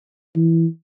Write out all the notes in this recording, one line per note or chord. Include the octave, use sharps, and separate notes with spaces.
E3